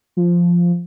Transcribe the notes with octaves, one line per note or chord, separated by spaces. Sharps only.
F3